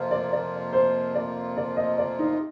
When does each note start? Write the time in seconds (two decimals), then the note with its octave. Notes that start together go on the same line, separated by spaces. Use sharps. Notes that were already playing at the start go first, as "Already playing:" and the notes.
Already playing: F2 C3 F3 A#3 F4
0.11 D5
0.32 D5
0.73 C5
1.15 D5
1.57 D5
1.76 D#5
1.98 D5
2.19 D#4